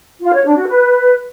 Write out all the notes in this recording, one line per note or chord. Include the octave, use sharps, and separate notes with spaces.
F4
C#5
D4
F#4
B4